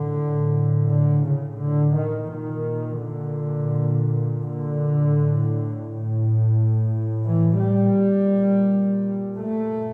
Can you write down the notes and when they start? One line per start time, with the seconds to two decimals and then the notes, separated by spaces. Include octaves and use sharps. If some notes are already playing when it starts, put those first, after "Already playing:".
Already playing: A2 D3
0.91 D3
1.26 C#3
1.61 D3
1.97 D#3
2.32 A#2 D#3
3.02 D3
4.43 D3
5.13 A2
7.24 E3
7.60 G3
7.95 A#2
9.35 A3